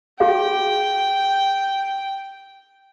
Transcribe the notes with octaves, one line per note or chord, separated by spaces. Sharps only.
F#4 G#4 F5 G5